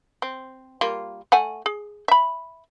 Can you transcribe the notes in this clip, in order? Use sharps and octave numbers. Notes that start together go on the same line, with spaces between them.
C4
G3 A#3 F4
A3 F#5 G#5
G#4
E5 B5